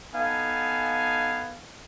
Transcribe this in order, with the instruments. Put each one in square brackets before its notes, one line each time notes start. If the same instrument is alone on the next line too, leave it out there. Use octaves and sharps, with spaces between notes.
[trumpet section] B3 D#4 A4 F5 G#5